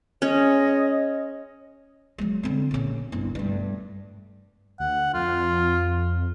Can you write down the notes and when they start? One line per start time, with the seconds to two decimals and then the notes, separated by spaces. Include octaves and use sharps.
0.22 G#3 C#4 C#5 D#5
2.18 F#3 G#3
2.43 D3 C4
2.71 A#2 C#3
3.12 G1 C2
3.35 G2 A3
4.80 D2 F#5
5.14 F2 F4